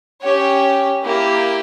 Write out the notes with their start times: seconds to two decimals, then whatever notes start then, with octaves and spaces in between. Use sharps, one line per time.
0.23 C#4 G4 C#5
1.03 A#3 E4 G4